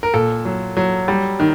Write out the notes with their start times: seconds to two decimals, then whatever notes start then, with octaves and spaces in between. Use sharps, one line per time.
0.03 A#4
0.14 A#2 A4
0.45 F#3
0.77 F#3
1.08 G3
1.40 D#3